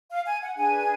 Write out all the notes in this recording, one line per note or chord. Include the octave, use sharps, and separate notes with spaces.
F5
G#5
F#5
D4 G#4 B4 G#5